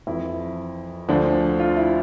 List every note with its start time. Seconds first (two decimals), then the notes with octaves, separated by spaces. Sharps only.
0.07 F2 E3 E4
1.09 D2 D3 F3 D4
1.60 F4
1.76 E4